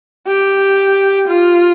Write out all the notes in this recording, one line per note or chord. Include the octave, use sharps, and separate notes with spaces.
G4
F4